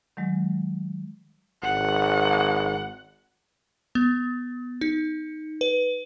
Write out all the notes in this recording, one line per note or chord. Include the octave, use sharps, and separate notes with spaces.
D#3 F#3 G#3
G#1 F#5
B3
D#4
B4